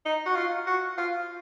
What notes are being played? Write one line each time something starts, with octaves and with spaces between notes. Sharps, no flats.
D#4
F#4
F4
F#4
F4